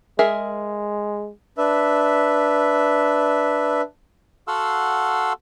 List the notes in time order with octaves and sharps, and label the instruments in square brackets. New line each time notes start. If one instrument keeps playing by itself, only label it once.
[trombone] G#3 [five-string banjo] G#4 A#4 E5
[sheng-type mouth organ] D4 B4 E5
[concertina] F#4 A4 F5 F#5 C6 E6